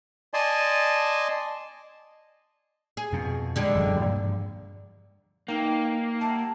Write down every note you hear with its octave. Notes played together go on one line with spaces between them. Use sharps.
D5 D#5 G#5 A5 C6
G#4
F2 B2
D3 G3 G#3
E1 F#2 E3
G2 F3 A#3
E3 A#3 D#4 G5
G3 E4 F#5 A5